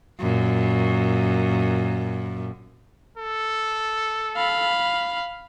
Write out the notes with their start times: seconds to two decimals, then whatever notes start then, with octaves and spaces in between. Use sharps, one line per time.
0.20 F#2 A#2
3.17 A4
4.36 F5 B5